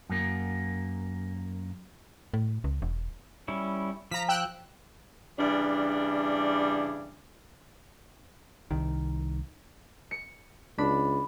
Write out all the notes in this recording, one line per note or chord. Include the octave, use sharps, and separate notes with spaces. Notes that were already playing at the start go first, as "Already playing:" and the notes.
F#2 A#3
A2
C#2
E1
G3 C#4 E4
F3 A#5 B6
G5 E6 F#6
C#3 E3 G3 D4
C2 D#3
C#7
C#2 D4 B5